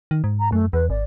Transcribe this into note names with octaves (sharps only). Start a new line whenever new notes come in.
D#3
G#2
A#5
F#2 A3
E2 B4
G#1 D5